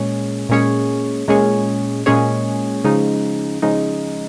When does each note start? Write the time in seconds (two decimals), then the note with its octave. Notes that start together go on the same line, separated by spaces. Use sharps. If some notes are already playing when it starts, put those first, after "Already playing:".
Already playing: A#2 G#3 C#4 G#4 C#5
0.49 A#2 G#3 C#4 G#4 C#5
1.28 A#2 G#3 C#4 G#4 C#5
2.06 A#2 G#3 C#4 G#4 C#5
2.84 C#3 F3 G#3 D#4
3.62 C#3 F3 G#3 D#4